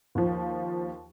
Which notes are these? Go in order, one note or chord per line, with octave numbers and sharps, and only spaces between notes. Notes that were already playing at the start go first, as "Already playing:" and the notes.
D#2 F3